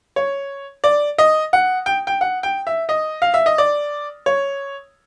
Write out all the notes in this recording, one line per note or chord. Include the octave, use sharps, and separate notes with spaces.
C#5
D5
D#5
F#5
G5
G5
F#5
G5
E5
D#5
F5
E5
D#5
D5
C#5